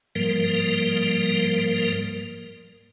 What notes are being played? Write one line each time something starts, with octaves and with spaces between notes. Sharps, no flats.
G#2 F3 G3 A#3 A#4